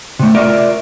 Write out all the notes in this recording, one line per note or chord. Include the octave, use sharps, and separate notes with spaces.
C3 A3
F4 A#4 D5 E5